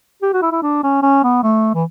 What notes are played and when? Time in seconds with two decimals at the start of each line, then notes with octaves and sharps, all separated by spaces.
0.22 G4
0.33 F#4
0.42 E4
0.52 E4
0.63 D4
0.83 C#4
1.02 C#4
1.24 B3
1.43 A3
1.75 E3